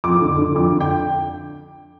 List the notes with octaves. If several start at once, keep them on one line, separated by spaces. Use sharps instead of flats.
F2 D6
D3
D3
F2 D6
D3
G5